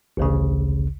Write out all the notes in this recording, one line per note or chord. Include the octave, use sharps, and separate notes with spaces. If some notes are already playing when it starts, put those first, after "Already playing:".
A1 D2 C#3